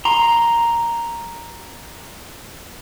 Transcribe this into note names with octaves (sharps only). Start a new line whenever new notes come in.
A#5 C6